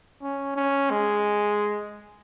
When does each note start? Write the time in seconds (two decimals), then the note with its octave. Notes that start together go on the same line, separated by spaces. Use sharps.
0.22 C#4
0.56 C#4
0.90 G#3